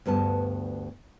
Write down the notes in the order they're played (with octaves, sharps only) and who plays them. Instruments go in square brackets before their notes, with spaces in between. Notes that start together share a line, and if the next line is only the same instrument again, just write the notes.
[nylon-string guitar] D2 G2 B3 A5